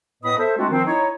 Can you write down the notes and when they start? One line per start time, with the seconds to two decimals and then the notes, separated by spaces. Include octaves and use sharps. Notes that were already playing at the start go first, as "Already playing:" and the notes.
0.23 A2 B3 B4 D#5 B5 D#6
0.38 A4 C5 E5
0.57 G#3 A3 C4 D4 F4 F#4
0.70 D#3 F3 C4
0.85 D#4 E4 C#5